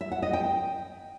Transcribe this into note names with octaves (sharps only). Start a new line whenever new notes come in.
E5
F#5
D#5
G5